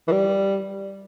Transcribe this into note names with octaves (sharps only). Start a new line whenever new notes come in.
E3
G3